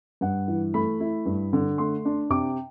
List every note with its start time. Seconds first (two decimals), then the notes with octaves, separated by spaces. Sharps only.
0.21 G2 F#5
0.48 E3
0.74 A3 B5
1.00 E4
1.26 G2
1.53 D3
1.78 A3 C6
2.05 D4
2.30 C3 D6